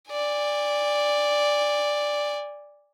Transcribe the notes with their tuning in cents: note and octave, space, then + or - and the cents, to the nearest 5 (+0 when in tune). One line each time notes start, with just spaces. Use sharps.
D5 +0 G#5 -35